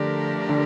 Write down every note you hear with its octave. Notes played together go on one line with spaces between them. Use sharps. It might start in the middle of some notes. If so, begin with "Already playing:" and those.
Already playing: D3 F3 A3 D4 G4 A#4
D3